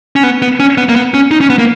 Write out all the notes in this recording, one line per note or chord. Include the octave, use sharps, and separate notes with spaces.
C#4
B3
B3
C#4
B3
A#3
B3
C#4
D#4
C#4
B3
A#3